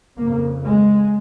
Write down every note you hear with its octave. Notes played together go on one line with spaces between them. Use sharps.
F2 C#3 A#3
G#3